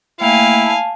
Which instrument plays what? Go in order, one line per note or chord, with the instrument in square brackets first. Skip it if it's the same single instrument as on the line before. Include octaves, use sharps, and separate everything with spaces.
[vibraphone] A3 A#3 G5 [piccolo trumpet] E4 [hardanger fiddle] F5 G#5
[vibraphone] A5